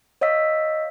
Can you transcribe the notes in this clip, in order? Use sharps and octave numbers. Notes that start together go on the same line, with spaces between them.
C#5 D#5 F5 E6 B6